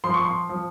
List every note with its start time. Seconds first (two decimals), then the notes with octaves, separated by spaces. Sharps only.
0.04 F3 C6
0.14 C#6
0.25 C6
0.49 F3